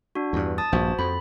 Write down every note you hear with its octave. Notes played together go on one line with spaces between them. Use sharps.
D4 F#4
E2 G2
A5 D#6 A6
A#1 G2 F#4 C5
F2 B5